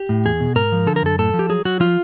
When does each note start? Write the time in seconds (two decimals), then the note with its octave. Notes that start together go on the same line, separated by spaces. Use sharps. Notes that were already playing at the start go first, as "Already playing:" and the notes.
Already playing: G4
0.09 A2
0.25 E2 G#4
0.40 B2
0.56 G#2 A#4
0.72 F3
0.87 D3 A4
0.96 A#4
1.02 F#2 A4
1.19 A2 A4
1.34 F3
1.39 G4
1.49 F#3 G#4
1.65 F#3 F#4
1.80 F3 F4